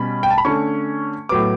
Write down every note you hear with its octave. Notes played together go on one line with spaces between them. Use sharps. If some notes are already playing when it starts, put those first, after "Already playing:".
Already playing: B2 G3 C#4 B5
G5
A5
B5
D3 A3 C#4 C#6
A2 F#3 B3 D6